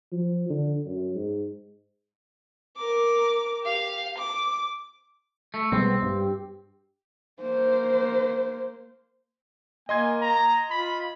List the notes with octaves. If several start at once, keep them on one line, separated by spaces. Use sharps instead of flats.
F3
D3
F#2
G#2
A#4 D6
G4 F5
D6
A3
B1 G3 G#3 B3 C4
G2 G4
A#3 C5
A#3 D#5 G#5 C6 G#6
A#5
F4 B5